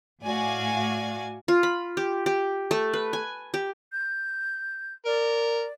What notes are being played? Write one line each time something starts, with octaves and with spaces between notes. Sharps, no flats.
A2 F#4 D5 F5 G#5
F4
B5
G4
G4
A3
B4
G#5
G4
G6
A#4 D5